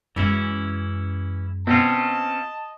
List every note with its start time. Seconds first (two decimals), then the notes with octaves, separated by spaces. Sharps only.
0.16 F#2 E3 G#3 C#4 E4
1.67 B2 C4 C#4 F4 D#5 A5